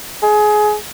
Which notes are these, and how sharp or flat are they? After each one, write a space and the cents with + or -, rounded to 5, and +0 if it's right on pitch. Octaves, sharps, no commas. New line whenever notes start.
G#4 +20